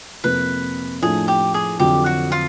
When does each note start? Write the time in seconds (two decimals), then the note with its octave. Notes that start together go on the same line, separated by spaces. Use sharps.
0.24 F2 C3 F3 A#3 B4
1.02 A2 F3 A3 D4 G#4
1.28 G4
1.54 G#4
1.79 F2 D3 F#3 G4
2.06 F#4
2.32 F4